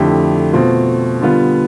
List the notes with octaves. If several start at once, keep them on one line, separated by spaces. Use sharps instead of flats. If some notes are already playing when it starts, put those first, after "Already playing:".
Already playing: F2 D3 A3 E4 G4
B2 A3 C4 F4
D3 G3 B3 F4